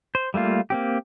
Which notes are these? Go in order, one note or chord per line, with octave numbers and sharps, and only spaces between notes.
C5
G3 A3 A#3 F4
A#3 C4 G4